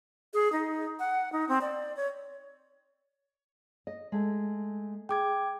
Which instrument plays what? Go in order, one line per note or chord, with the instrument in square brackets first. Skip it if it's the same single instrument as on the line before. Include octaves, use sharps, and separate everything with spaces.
[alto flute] G#4
D#4
F#5
D#4
C4
D5
C#5
[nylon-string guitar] D#5
G#3 A3
[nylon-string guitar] G#4 [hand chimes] G5 D6 G#6